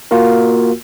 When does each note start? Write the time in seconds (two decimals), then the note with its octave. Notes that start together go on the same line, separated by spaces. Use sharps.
0.11 A#3 F4 F#4 A#4